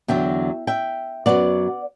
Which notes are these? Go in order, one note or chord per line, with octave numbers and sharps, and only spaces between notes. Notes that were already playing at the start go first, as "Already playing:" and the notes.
E2 D3 F#3 E5 G5
E5 G5
F#2 C#3 F#3 B3 D5 F#5